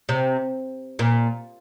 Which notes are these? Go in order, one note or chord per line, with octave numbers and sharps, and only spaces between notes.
C3
A#2